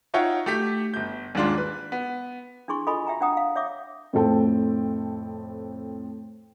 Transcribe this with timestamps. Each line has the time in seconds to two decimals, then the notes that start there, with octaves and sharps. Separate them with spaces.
0.14 D#4 F4 C#5 E5 F#5 G5
0.46 A3 G4 B6
0.94 G1 G6
1.35 D#2 G#2 G#3 D4 F4 C6
1.58 B4
1.92 B3
2.68 D4 E4 G#4 C6 C#6
2.87 F4 A4 D#5 G#5 B5 C#6
3.07 F#4 E5 G5 A#5
3.21 D4 C5 F#5 G5 A#5 D#6
3.37 F5
3.56 C#5 E5 D6 D#6
4.13 F2 A2 C4 A4 G5